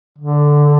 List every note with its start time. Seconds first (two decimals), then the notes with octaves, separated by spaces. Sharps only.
0.18 D3